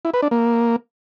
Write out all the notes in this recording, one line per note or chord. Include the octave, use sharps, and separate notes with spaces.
E4
B4
D4
A#3